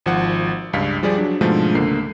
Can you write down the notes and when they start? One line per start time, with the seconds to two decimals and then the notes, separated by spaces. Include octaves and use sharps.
0.06 G#1 F3 F#5
0.73 C#2 G2 D4 F5 B6
1.03 F3 G3 G4 G#4 D5
1.18 F#3 D4
1.41 G#2 B2 D3 F3 G#3 A3
1.75 C#2 D3 A#3 C7